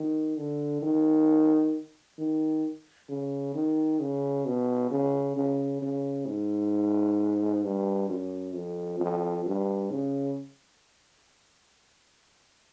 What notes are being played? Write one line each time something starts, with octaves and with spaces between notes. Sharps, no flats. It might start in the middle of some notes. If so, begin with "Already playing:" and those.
Already playing: D#3
D3
D#3
D#3
C#3
D#3
C#3
B2
C#3
C#3
C#3
G#2
G2
F#2
F2
F2
G2
C#3